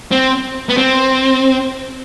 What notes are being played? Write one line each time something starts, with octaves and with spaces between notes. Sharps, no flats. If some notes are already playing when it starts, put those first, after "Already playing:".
C4
B3
C4